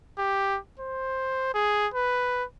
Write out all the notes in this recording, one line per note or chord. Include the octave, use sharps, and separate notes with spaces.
G4
C5
G#4
B4